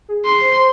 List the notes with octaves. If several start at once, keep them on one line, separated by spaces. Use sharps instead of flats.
G#4
G#4 C6
C5
C5